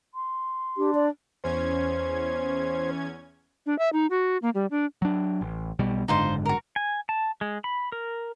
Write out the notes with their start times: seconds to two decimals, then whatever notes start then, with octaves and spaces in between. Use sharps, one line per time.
0.15 C6
0.77 D4 G4
0.95 D5
1.44 E2 C#4 C5 G#6
3.66 D4
3.79 E5
3.93 D#4
4.10 F#4
4.42 A#3
4.55 G3
4.71 D4
5.02 F#3 D4
5.41 A1
5.79 B1 B2 G3
6.08 F#1 G#2 D3 D#4 F4 C5
6.45 F#4 A#4
6.76 G#5
7.09 A5
7.41 G#3
7.64 B5
7.92 A#4